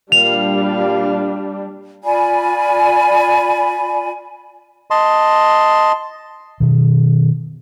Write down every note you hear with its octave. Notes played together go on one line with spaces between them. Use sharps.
A#2 G3 D4 G4 F5 F7
F4 D5 G#5 B5
D#5 A5 C6
B2 D#3